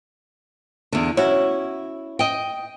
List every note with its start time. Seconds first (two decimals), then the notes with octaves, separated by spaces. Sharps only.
0.93 E2 D3
1.17 C#4 E4 F#4 C#5
2.19 D#5 G5